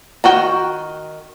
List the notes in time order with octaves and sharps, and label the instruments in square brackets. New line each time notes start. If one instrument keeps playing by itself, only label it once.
[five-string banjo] D#3 F#4 G5